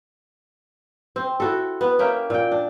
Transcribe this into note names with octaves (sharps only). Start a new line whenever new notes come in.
C4
E4 F#4 A4
B3
A#3 C#4 E5 G5
A#2 G5
D4